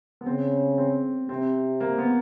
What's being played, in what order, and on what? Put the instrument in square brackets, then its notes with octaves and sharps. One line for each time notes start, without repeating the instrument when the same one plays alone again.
[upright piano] B3
[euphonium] C#3 [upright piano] C4
[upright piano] C4
[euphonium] C3 [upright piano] C4
[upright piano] A#3
B3